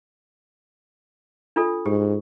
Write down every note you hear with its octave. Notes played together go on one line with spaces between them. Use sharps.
D4 F4 A4
G#2 G4